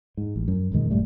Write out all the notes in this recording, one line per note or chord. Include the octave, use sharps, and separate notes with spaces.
G#2
A1
F#2
E1 A#2 D#3 G#3
D#1 G2 G3 A3